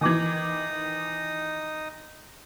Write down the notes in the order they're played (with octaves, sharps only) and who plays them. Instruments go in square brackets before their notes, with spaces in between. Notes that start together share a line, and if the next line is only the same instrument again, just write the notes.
[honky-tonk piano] D#3 E3 [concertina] D#4 D#6 [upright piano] G#5 D6 G#6